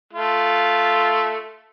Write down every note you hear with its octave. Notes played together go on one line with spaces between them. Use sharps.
A3 F4